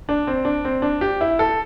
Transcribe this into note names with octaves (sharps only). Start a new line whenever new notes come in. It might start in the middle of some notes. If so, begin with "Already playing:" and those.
D4
C4
D4
C4
D4
G4
E4
A4